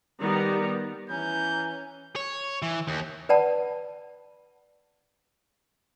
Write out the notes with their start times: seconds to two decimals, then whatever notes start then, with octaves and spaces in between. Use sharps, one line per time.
0.18 D#3 G3 B3 A#5
1.10 E3 C#4 A#5 G6
2.16 C#5
2.62 E3
2.87 D#2
3.29 B4 D5 F#5 A5 B5